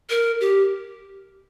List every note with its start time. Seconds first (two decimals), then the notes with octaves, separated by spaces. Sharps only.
0.10 A#4
0.41 G4